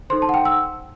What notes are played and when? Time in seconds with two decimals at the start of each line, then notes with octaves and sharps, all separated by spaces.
0.10 D#4 A4 C5 C6
0.22 A5
0.29 F#5
0.34 G5
0.45 E6